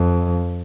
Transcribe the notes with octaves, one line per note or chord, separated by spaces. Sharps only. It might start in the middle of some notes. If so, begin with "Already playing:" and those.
Already playing: F2